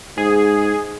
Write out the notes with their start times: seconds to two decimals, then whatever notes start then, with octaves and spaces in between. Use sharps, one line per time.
0.18 G#2 G#4